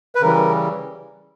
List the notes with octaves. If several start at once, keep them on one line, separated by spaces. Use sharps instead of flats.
B4
C#3 E3 G3 A#4